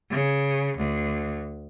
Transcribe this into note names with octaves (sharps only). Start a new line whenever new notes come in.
C#3
D2